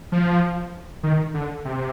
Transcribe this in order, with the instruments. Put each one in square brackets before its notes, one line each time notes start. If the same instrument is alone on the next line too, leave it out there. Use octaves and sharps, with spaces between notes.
[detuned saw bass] F3
D#3
D3
C3